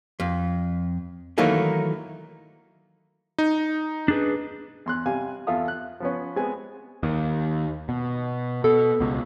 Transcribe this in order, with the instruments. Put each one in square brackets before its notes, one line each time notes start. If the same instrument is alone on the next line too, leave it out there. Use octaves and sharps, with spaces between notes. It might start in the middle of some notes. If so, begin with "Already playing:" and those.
[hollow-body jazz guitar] F2
D#3 E3 F#3 A3 A#3 D#4
[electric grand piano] D#4
[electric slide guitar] D4 G#4 B4
[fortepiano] E2 C6 F#6
C3 G3 F5 G#5
E2 F4 A4 E5 F5 D#6
F#6
F3 B3 C#4
G#3 B3 C4 G#5
[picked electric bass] D#2
B2
[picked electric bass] B2 [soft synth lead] A4
[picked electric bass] C#2 B2